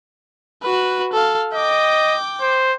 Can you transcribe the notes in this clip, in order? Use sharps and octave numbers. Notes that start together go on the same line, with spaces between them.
F#4 B4
A4 F5
D#5 G5 D6
C5